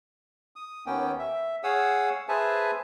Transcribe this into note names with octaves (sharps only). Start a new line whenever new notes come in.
D#6
D#2 A#3 B3 C#4 G5
E5
G#4 C#5 F5 F#5 D#6 E6
G#4 B4 C5 E5 G#5 A5